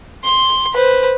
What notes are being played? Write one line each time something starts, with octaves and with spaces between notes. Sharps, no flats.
C6
B4 C5